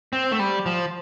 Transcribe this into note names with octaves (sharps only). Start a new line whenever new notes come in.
C4
A3
G3
F3